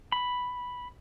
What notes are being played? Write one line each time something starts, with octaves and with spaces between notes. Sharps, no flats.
B5